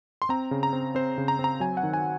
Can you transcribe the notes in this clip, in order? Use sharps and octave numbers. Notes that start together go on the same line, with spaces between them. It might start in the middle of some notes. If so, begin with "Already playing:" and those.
C6
C4 A#5
C#3
A#5
C4
C4 C5
C#3
A#5
C4
A#5
F#3 G#5
F#5
D#3
G#5